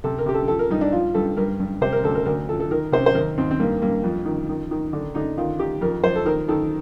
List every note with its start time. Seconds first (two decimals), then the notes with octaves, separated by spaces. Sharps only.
0.04 C3 A4
0.18 A#4
0.26 C3 G4
0.34 A4
0.48 F3 A4
0.59 A#4
0.71 G2 D#4
0.81 D4
0.92 F3 F4
1.14 G2 A4
1.37 G2 A#4
1.60 G2
1.81 C3 C5
1.92 A#4
2.03 D2 A4
2.15 A#4
2.26 D2 A#4
2.49 F3 A4
2.60 A4
2.71 D#3 A#4
2.92 C3 C5
3.06 C5
3.14 D#2 A#4
3.38 D#2 C4
3.51 C4
3.60 G2 A#3
3.82 G2 A#3
4.04 F2
4.25 D#3
4.49 D#3
4.71 D#3
4.93 D3
5.15 D3 D#4
5.38 D#3 F4
5.59 D#3 G4
5.81 F2 A#4
6.04 F2 C5
6.16 A4
6.25 D#3 A#4
6.48 D#3 A4